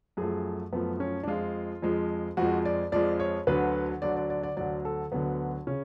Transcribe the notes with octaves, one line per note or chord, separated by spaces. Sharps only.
F#2 F3 A3 G#4
F#2 F3 A3 B3
C#4
D4
F2 F3 G#3 F4
F2 F3 G#3
F2 F3 G#3 F#4
D5
F2 F3 G#3 D5
C#5
D2 D3 F#3 B4
D2 D3 F#3 D5
D5
D5
D5
D2 D3 F#3 D5
A4
D2 D3 F#3 B3
C#3 C#4